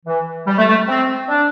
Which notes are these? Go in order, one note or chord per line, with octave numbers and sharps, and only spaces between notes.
E3
G3
A3
A3
C4
D4